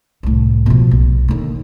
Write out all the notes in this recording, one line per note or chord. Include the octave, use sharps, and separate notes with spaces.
C2 A2
B2 F3
B1
D#2 D3